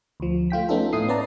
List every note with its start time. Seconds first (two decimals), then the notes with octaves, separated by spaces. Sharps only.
0.20 D2 F3
0.50 A3 F4 G5 B6
0.69 A3 B3 C#4 D#4 F4 A4
0.93 A2 E4 D#6 C7
1.08 B3 C#4 B4 D5 A5 A#5